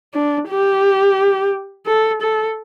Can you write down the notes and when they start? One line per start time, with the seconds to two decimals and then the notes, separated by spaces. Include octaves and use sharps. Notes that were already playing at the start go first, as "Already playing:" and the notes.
0.14 D4
0.49 G4
1.87 A4
2.22 A4